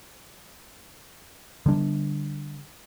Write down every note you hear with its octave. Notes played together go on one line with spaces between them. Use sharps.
D3 G3 D4